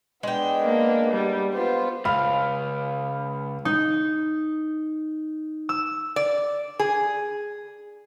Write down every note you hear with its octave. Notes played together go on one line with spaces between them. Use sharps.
G#3 B3 D4 G5
A#3
G3
B3 F4 C5
C#2 F5 B5
D#4
E6
D5
G#4